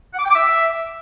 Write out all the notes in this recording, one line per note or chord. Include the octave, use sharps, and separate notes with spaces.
F#5
D6
G5
D6
E5